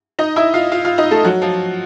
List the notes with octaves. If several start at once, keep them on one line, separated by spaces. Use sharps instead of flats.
D#4 D#5
E4 E5
F4 F5
F4 F5
F4 F5
D#4 D#5
A3 A4
F#3 F#4
F3 F4